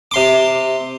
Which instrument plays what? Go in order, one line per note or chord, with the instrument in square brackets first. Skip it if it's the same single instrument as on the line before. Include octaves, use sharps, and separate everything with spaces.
[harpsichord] C3 C6 D6